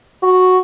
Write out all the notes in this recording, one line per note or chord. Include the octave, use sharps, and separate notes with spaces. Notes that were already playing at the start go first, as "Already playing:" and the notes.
F#4